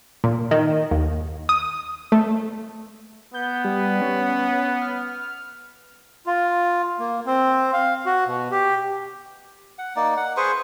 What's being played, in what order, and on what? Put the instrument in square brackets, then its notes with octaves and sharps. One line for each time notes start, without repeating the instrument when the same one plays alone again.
[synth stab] A#2
D#3
D#2
D#6
A3
[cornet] B3 [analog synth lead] G6
[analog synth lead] G3
C#4
F6
[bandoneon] F4
A#3
C4
F5
F#4
B2
G4
[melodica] F#5
A#3 D#4 D5
F#5
G#4 B4 C5 C#6